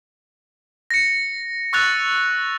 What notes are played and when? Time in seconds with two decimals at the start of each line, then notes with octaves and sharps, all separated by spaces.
0.90 A#6 C#7
1.73 C#6 E6 F#6 A6 F7